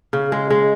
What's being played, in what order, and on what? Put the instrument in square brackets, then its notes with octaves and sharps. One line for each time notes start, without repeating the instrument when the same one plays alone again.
[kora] C#3
G#3
G#3